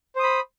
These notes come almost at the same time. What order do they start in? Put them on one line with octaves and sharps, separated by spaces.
C5 D#6 B5